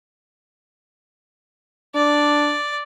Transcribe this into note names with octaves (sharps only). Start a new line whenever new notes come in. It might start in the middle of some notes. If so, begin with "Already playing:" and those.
D4 D5